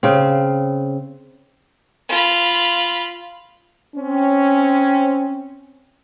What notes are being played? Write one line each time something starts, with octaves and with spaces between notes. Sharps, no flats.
C#3 C4
F4 B5
C4 C#4